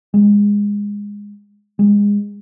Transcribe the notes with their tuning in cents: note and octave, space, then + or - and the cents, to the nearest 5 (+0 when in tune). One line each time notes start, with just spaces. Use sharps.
G#3 -20
G#3 -25